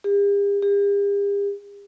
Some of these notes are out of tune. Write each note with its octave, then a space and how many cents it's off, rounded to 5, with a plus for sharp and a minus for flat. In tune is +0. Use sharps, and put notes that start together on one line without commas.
G4 +45
G4 +45